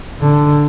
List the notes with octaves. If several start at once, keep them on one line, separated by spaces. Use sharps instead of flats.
D3